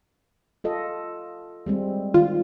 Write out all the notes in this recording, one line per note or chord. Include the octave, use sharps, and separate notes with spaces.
F4 A4 D#5
G3 G#3 C4
D#3 F4